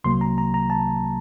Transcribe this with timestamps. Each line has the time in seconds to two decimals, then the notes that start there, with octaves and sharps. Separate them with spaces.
0.04 C2 C3 F#3 A#3 C6
0.21 A#5
0.38 A#5
0.54 A#5
0.70 A5